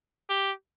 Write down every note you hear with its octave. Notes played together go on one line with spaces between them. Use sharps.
G4